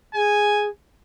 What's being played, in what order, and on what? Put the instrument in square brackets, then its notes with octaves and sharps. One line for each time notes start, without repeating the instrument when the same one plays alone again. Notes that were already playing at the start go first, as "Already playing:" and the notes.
[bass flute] G#4 [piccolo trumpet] G#5